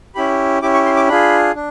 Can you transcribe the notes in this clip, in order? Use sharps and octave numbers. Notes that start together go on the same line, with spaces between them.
C#4 E4 G4 B5
C#4 E4 G4 D6
C#6
C6
D6
D4 F4 G#4 B5
D4